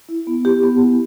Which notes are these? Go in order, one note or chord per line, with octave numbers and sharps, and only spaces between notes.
E4
B3
E4 G4
B3
E4